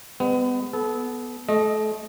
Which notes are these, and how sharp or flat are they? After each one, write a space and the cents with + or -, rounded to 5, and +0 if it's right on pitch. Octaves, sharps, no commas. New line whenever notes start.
G#3 -40 B3 +30
B3 +0 A4 -30
A3 -35 D#5 +0